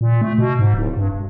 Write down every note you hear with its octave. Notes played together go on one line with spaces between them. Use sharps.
A#2
A3
B2
G#2
D1
G2
E1